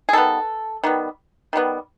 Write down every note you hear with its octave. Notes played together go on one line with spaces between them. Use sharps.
G#4
D#3 G3 B3 A4
D#3 G3 B3
D#3 G3 B3